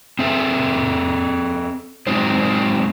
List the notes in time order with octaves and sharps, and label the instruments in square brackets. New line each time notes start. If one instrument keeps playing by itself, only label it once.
[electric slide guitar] C4 G#4 A4 E5
F#3 G#3 C4 D#4 C5